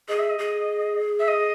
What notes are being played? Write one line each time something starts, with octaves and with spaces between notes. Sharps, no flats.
G#4 D#5
E5
D#5
G#4
E5
D#5